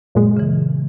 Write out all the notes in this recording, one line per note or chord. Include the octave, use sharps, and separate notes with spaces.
F#2 A#2 G#3
C#3 E3